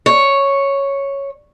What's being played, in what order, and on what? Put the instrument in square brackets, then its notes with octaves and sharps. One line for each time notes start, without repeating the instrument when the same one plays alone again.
[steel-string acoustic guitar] C#5